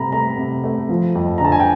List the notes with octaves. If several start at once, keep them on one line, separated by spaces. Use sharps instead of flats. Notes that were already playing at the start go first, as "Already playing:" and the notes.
Already playing: C3 A3 A#5 B5
A3 A#5
C3
A3
F3
F2
A#5
D3 A5
G#5
G5